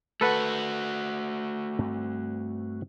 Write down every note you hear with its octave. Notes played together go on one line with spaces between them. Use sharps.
A3 F#4 A4 B4 F#5
G2 C4